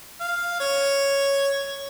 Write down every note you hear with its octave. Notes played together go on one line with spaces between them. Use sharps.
F5
C#5